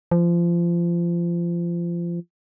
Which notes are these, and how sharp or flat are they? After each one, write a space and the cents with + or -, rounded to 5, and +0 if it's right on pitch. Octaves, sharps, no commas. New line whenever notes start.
F3 -25